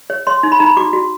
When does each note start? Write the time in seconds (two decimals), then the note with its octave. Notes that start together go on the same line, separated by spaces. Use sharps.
0.10 C#5
0.27 C#5 C6
0.43 D#4
0.52 B5
0.59 D#4 A#5
0.66 B5
0.77 F#4 D6
0.93 F#4